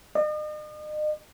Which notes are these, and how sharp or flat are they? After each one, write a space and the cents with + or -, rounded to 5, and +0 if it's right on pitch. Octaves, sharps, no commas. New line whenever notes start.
D#5 -40